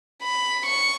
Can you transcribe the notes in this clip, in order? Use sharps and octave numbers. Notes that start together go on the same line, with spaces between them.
B5
C#6